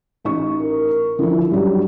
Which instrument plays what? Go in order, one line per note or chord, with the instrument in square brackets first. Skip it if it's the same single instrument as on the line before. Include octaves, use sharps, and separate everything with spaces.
[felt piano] A1 D#4 C#6
[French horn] A#4
[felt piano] D3 F3 [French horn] E4
[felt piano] G2 F#3 [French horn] G3